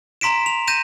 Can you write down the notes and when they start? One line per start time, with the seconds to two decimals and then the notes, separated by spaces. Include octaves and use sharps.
0.21 A#5 C6 B6 D7 E7
0.46 F7
0.68 G6 A#6 D#7 E7